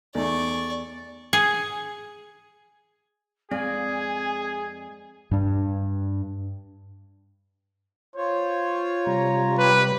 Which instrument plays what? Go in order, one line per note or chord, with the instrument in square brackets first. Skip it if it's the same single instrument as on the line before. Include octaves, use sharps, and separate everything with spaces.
[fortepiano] E2 A3 D#4 [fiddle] D5 C#6
[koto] G#4
[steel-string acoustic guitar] F2 G#3 D5 [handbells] C4 [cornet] G#4 [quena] G#5
[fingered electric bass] G2 D4
[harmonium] F4 C#5 [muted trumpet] C5
[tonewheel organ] C3 G3 [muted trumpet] A#5
[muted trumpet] G4 [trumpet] B4